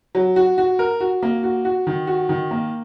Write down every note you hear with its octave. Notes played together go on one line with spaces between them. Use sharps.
F#3
F#4
F#4
A#4
F#4
A#3
F#4
F#4
D#3
F#4
D#3
A#3